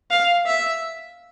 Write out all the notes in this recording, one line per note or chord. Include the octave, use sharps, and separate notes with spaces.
F5
E5